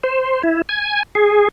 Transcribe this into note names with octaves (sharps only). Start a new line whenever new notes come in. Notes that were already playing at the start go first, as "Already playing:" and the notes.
C5
E4
G#5
G#4